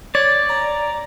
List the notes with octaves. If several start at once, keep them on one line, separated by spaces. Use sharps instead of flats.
C#5 D5
A#5